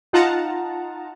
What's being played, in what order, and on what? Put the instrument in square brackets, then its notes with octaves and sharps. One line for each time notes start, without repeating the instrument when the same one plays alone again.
[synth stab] D#4 F4 F#5 A5 A#5